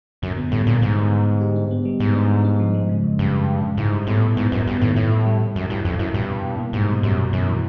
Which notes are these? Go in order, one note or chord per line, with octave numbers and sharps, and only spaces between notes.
F#2 D3
B3
A2 G3
A#2 D3
G#2 G3
B3
D3
D3
G4
D4
B3
G3
G#2 B3
D4
G3
D4
F3
G#3
C#3
F#2
G2 C#3
G#3
C#3
C#3
G#2 E4
G3
A2 B3
E4
G#2 B3
F#2 B3
G2 B3
A2 D#3
A2 E4
E4
G3
G3
F#2 E3
G2 E4
F2 E4
F#2 E4
G2 B2
B2
B2
A#3
G#2 G3
B2
F#2 G3
B2
F#2 E3
E3